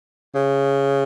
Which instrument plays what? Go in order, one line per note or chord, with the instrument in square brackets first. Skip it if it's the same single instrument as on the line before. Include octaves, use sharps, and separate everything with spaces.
[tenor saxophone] C#3